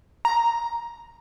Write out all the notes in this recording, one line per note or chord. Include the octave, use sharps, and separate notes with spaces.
A#5